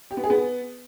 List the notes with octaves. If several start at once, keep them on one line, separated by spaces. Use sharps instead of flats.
G4
B3
G#4
B3